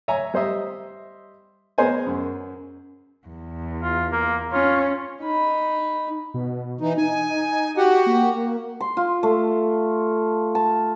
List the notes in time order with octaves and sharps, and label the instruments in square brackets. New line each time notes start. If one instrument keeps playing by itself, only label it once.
[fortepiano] C#5 E5 G#5 A#5
G3 C5 D#5 E5
B3 G#4 A#4 C5 C#5 G#5
F#2
[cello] E2
[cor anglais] F4
A#3
[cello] C#4 [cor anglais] F4
[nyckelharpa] D#4 B5
[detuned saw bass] B2
[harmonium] E3 D#4
[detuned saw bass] D#4 [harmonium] G#5
[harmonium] F#4 G4 F#5
[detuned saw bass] A#3
[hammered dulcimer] C6
F4
A3
A5